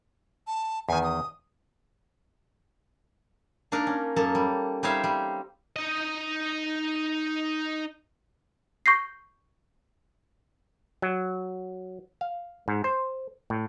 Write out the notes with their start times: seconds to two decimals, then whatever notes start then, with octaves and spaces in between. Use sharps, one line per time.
0.47 A5
0.89 E2 D#3 G#5
1.03 D#6
3.72 A#3 D4 D#4 A#4
3.87 C#4
4.16 F#2 A#3 A4
4.35 G3
4.83 G3 C4 D#4 C#5 E5 F5
5.04 G3
5.76 D#4 D#5
8.86 C#6 G6 A#6 C7
11.02 F#3
12.21 F5
12.68 G#2
12.84 C5
13.50 A2